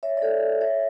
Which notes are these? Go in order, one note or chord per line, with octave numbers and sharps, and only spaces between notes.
C#5 E5
D5
A4 C#5
C#5 E5